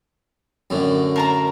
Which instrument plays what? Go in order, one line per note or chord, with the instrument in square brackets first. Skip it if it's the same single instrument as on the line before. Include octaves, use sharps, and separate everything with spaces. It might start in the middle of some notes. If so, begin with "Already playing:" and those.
[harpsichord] F#2 A2 D3
[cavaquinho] A#4 A5 A#5